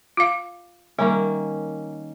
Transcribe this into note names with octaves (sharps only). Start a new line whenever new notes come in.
F4 F5
D#3 G3 A#3 C#4